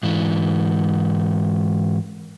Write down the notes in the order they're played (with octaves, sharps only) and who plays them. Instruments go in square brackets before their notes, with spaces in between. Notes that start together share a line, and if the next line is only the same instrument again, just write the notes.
[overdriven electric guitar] G#2 E3